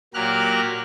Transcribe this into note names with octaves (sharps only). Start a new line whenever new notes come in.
A#2 F#3 G4 A#4 F6 F#6